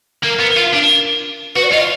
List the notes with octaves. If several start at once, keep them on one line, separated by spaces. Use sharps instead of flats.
A#3 A#4
B3
F4
D4
F#4 B4
D5
F4 D#5
D5